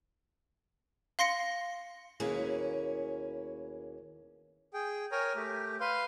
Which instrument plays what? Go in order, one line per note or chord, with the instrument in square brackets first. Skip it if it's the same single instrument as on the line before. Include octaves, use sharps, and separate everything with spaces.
[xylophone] F5 C6 A#6 C#7
[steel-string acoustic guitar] D#2 B2 A#3 C#4 E4 G#4
[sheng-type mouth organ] G#4 G5
A#4 C#5 G5 G#5 A#5
A3 G4
B4 F5 C6